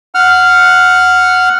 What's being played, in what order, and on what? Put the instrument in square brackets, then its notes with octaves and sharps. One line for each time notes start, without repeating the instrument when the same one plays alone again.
[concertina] F#5 F6